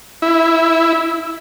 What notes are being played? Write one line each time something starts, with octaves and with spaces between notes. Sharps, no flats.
E4